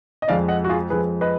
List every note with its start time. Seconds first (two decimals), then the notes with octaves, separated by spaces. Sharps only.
0.22 D#5
0.28 F2 F3 G#3 D5 F5
0.48 D#5 F#5
0.64 F#4
0.69 F4 G#4
0.90 F2 F3 G#3 G#4 B4
1.21 B4 D#5